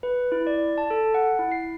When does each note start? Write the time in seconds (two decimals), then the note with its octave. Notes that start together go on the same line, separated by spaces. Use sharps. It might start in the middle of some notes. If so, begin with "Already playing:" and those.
0.03 B4
0.32 E4
0.47 D5
0.78 A5
0.90 A4
1.14 F#5
1.39 E4
1.52 C7